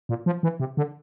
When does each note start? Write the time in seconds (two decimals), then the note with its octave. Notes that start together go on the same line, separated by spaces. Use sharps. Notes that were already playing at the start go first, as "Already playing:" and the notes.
0.09 A#2
0.26 F3
0.43 E3
0.60 C3
0.77 D3